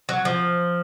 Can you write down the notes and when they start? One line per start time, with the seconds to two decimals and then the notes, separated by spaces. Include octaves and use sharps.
0.09 F#3
0.25 F3